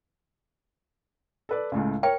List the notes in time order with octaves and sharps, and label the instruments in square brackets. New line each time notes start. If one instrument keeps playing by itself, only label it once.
[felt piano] A4 B4 D5
C#2 A2 C#3
[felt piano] A#4 C#5 [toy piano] G5